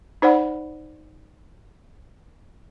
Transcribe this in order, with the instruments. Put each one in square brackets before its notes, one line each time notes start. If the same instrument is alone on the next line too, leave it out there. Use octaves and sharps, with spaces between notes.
[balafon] D#4 C5 D5 F#5 B5